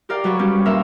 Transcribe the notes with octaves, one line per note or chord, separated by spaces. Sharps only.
G4 A#4 D5 F5 G5
F#3 B4 C#5 C#6
G3 C#4 G4
A#2 A#4 E5 F5